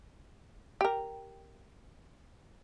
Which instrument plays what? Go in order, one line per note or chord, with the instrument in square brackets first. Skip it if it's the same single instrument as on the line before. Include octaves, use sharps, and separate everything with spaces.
[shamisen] G4 A#4